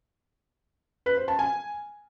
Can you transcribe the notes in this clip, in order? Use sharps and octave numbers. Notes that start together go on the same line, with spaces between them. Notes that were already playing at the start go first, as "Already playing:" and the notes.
B4
C5
A5
G#5